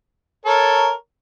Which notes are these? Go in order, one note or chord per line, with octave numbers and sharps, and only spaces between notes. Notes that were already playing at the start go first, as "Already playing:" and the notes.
A4 A#4 C#5